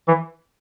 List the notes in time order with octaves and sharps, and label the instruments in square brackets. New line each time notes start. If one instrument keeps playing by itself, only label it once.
[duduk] E3